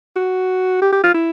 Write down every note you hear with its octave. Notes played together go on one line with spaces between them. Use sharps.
F#4
G4
G4
F4
E4